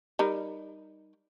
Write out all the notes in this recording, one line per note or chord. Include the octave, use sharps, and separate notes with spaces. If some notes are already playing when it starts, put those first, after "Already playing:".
G3 D#4 A#4